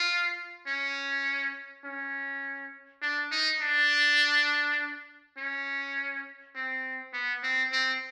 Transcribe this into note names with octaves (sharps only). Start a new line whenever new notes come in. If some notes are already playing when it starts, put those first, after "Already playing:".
Already playing: F4
C#4
C#4
D4
D#4
D4
C#4
C4
B3
C4
C4